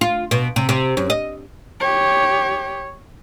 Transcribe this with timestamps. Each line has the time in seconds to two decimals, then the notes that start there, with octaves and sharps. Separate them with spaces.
0.01 F4
0.31 B2
0.56 C3
0.69 C3
0.97 F#2
1.10 D#5
1.80 G4 C#5